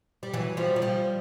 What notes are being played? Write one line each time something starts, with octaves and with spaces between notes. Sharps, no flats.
G3
E3 F#3
F3 G3
F#3
F3 G3